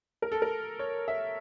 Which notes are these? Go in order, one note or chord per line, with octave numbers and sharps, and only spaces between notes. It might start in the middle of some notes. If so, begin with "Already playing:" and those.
A#4
A4
A#4
C#5
E5